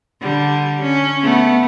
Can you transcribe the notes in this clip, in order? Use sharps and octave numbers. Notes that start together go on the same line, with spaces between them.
D3 G3
C#4
A3 B3